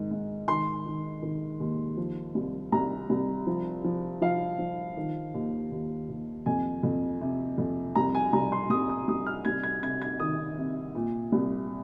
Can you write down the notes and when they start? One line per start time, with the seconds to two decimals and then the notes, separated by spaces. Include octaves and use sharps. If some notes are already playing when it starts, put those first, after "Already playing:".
Already playing: G#2 D#3
0.11 G#2
0.48 D#3 C6
0.86 D#3
1.22 D#3
1.60 D#2
1.97 F3
2.35 C2
2.72 C2 A#5
3.10 C2
3.47 F3
3.84 F3
4.21 F3 F5
4.59 F3
4.97 D#3
5.34 D#2
5.71 D#2
6.09 D#2
6.46 F2 G#5
6.83 F2
7.21 C3
7.58 F2
7.95 C2 A#5
8.15 G#5
8.33 C2 A#5
8.52 C6
8.70 C2 D#6
8.89 D#6
9.08 C2 D#6
9.26 F6
9.45 C2 G#6
9.63 G#6
9.82 C3 G#6
10.02 G#6
10.20 D#3 D#6
10.58 C3
10.95 A#2
11.32 C2